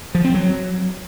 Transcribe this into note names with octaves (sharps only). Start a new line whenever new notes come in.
F3
C4
F#3